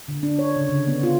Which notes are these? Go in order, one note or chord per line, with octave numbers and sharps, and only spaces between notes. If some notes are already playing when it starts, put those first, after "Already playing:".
D3
D4
C#5
C#3
D3
B3
F4